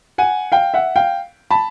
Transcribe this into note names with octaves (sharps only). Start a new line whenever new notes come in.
F#5 G#5
F5 G5
E5 F#5
F5 G5
A5 B5